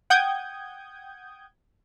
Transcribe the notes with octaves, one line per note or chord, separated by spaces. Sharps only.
F#5 G5 D#6 G6 G#6